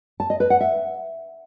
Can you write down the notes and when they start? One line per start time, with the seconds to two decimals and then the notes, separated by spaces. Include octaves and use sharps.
0.20 A5
0.30 D#5
0.40 B4
0.50 F#5
0.61 E5